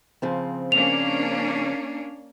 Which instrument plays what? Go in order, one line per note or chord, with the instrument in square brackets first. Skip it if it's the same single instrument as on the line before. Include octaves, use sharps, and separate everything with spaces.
[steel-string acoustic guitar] C#3 F3 C4
[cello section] A#3 C#4 D4 [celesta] F7